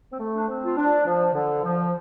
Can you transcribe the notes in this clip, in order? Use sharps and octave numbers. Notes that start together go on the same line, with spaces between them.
C4
A3
D4
C4
F4
D4
F3
D3
F3